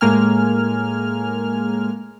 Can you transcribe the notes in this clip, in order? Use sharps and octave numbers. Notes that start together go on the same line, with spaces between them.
A2 G#3 A#3 G#5 F6